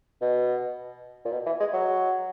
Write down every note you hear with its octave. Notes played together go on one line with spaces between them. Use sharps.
B2
A#2
B2
E3
G#3
F#3